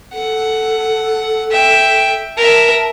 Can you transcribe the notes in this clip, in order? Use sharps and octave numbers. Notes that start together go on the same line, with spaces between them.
A4 F#5
E5 G5
A#4 E5 A5